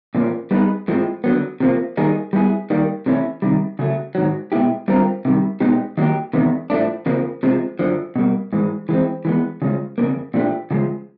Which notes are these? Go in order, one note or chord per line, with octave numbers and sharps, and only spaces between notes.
A#2 F3 A#3 C#4
G3 B3 D#4 G#4 B4
A2 F3 G#3 C4
D3 F#3 B3
C3 F3 A#3
D#3 G3 A#3 D#4 G#4
G3 B3 E4 G#4
D#3 G3 A#3
C3 E3 A3 C#4 E4
C3 D#3 G3
C#3 F#3 A3
G#2 D#3 F#3
B2 G#3 B3 E4 G4
D3 G3 C4 F4 A#4
C3 D#3 G3
B2 G#3 B3 D#4 G4
D#3 F#3 A#3 D#4 G4
E2 C3 D#3 G#3 B3
A2 F3 A3 D4
F2 C#3 F3 A#3
C3 F3 G#3
F#2 D3 F3
B2 G3 A#3
G#2 E3 G#3
E3 G#3 C4
E3 G#3 B3
C#3 F3 G#3 C#4
F2 C#3 F3 A#3
A#2 F3 A3 D4 G4
C#3 F3 G#3